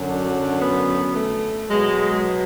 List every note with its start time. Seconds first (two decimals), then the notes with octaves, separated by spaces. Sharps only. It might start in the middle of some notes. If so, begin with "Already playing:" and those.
Already playing: F#2 D3 F#3
0.08 D4
0.62 B3
1.16 A3
1.69 B2 F#3 G#3